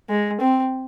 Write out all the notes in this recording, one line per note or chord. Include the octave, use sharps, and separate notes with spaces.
G#3
C4